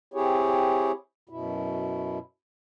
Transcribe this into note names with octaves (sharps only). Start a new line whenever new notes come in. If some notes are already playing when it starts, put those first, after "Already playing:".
C4 E4 G4 G#4 C#5
F#2 B2 E4